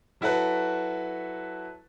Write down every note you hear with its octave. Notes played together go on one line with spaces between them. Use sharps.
F#3 E4 F#4 A4 B4